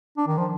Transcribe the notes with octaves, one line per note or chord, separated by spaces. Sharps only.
D4
D#3
F3